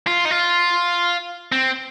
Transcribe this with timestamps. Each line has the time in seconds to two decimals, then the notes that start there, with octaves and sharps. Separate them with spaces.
0.07 F4
0.25 D#4
0.31 F4
1.52 C4